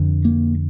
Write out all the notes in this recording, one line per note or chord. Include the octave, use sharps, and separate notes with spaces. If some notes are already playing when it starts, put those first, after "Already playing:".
Already playing: F2 D3
A#3